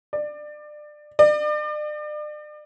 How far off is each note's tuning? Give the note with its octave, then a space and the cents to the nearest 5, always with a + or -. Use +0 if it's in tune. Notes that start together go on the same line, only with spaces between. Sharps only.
D5 +25
D5 +40